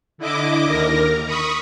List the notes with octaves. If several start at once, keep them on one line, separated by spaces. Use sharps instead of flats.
D3 E4 D#5 D6
D#2 A#4 A#5
B5 C#6 D#6